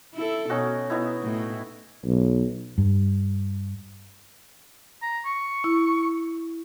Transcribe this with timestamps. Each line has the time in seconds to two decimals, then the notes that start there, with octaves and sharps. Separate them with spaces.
0.15 E4 A4
0.50 B2 C#4 D#4 F#4
0.90 B3 D#4 E4
1.23 A2
2.05 B1
2.78 G2
5.02 A#5
5.26 C#6
5.64 E4